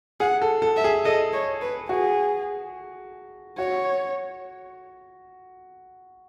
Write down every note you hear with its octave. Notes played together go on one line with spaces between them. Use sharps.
G#4 F#5
A4
A4
E5
G#4
A4 D#5
C#5
B4
F#4 G#4
F#4 C#5